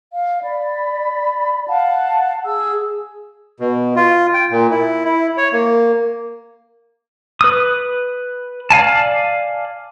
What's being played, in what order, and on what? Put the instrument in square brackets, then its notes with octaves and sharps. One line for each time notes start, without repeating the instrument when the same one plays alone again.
[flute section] F5
D5 B5
F5 F#5 A5
G#4 E6
[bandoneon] B2
F4
G5
A#2
E4
E4
C#5
A#3
[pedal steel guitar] B4 D#6
D5 F5 G#5 A5